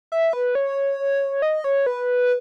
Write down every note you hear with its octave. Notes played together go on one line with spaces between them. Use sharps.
E5
B4
C#5
D#5
C#5
B4